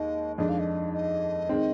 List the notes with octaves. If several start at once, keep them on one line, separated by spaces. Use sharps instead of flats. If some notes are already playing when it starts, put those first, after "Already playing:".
Already playing: D#2 D#3 G#3 D#5
F2 D#3 G#3 D4 D#5
F5
D#5
D#5
D#3 G#3 C4